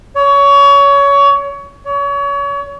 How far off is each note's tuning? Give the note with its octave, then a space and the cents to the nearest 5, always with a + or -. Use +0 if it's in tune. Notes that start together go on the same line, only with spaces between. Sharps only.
C#5 +25
C#5 +30